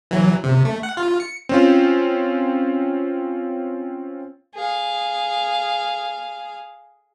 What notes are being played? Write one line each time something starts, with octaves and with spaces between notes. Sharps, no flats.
E3 F#3
C3
A3
F#5
F4
C#7
C4 C#4 F4
G#4 F5